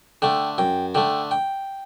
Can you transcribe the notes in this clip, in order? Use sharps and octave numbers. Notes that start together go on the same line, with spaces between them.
D3 A3 G5
F#2 G5
D3 A3 G5
G5